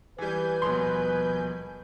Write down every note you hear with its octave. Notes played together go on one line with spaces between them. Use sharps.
E3 G3 B4 G#5 G6
D#1 B2 F3 C#5 C6